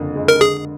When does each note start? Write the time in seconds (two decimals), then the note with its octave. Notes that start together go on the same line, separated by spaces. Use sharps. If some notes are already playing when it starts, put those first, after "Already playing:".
Already playing: F#1 F2 D3
0.16 G#3
0.28 A#4
0.40 D3 G#4